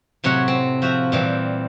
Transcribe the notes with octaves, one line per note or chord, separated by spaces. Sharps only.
A2 C3 F#3 C#5 F#5 B5
C4
F3 F#4 E5
A#2 E3 G3 C4